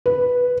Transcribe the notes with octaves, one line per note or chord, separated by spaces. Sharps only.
B4